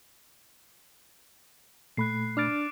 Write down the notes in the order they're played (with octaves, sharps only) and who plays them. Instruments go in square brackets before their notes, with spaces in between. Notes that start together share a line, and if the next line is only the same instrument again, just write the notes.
[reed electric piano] A#2 A3 B5 [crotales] F#6 C7
[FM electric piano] D4 F6 A6 [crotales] D6 D7